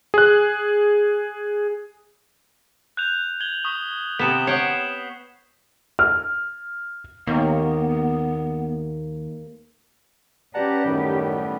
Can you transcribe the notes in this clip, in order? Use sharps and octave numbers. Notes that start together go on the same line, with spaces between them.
G#4 F#6
F#6 G6 F7
G#6 F#7 G7
C#6 D#6 G7
C3 B3 B6 E7
C#5 F#5 G5 C7
F6
D#2 A#3 B3
C#4 G4 B4 D5 F#5 A5 A#5
F#2 A2 D#3 G3 B3